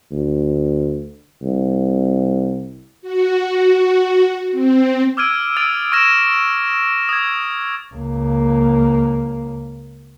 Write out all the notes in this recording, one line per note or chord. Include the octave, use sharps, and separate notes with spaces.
D2
C2
F#4
C4
D6 E6 F6 G#6 D7 D#7
D#6 E6 A6 D7 F7
C#6 F6 G#6 A#6 D7 E7
D#6 G#6
C#2 A#3